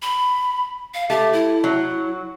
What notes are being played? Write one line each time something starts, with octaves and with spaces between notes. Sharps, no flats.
B5
F5
A3 G4
E4
F#3